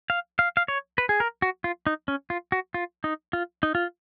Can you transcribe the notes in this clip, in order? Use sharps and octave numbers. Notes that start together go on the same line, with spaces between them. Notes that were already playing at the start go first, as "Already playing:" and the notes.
F5
F5
F5
C#5
B4
G#4
A#4
F#4
F4
D#4
C#4
F4
F#4
F4
D#4
F4
D#4
F4